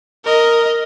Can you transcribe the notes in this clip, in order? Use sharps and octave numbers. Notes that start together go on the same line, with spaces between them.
A#4 D#5